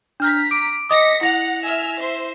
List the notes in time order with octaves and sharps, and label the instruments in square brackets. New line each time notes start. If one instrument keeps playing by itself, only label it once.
[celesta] D4 F6 G6 [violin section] A#5 B6
[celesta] D6 D7
[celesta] D#5 D6 D#6 [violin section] A#6 B6 C#7
[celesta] E4 A#6 F7 [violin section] F#5
[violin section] E5 G#5 F6
C5 E5 C7